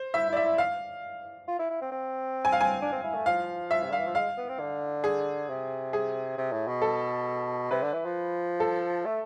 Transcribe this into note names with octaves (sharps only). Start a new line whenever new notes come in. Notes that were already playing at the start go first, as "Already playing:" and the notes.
Already playing: C5
E4 E5
E4 D5
E5
E4
F5
F4
E4
E4
C4
C4
G#5
F5
G#5
D4
C4
E4
A3
F3 F5
E5
C3
D3 F5
E3
F3
G#3 F5
B3
C4
D3
G#4
C3
G#4
C3
A2
B2
A4
C3 B4
D3
E3
F3
A4
A3